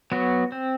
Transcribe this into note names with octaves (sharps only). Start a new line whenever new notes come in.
F#3 B3 F#4
C4